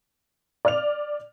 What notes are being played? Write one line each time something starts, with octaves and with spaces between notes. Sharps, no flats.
D5 F6 F7